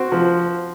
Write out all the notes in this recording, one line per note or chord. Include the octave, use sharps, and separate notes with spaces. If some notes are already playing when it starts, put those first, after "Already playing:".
Already playing: C4 F#4
F3